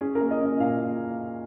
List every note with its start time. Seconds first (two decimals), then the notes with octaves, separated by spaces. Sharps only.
0.01 C#4 G#4
0.15 A#4
0.21 A#3
0.31 D#5
0.41 C#4
0.46 D#5
0.60 A#2 F5